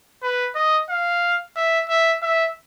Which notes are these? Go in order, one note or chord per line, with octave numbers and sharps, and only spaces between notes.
B4
D#5
F5
E5
E5
E5